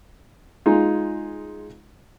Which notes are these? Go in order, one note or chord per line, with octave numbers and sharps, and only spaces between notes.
G#3 D#4 F4